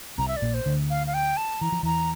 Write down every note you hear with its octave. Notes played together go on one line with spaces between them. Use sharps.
C2 C3 A#5
E5
D5
A#1 A#2
C5
D2 D3
F5
F5
G5
A5
E3 A#5
F3
E2 E3 A#5